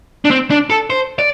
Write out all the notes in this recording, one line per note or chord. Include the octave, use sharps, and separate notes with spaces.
D4
C4
D4
A4
C5
D5